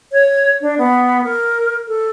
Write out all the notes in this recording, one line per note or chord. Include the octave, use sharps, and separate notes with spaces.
C#5
D4
B3
A#4
A4